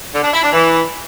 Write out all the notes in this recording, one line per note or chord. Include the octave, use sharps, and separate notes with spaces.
D3
D4
E4
D4
E3